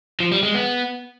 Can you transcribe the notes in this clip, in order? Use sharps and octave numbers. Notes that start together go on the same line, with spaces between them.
F3
G3
G#3
B3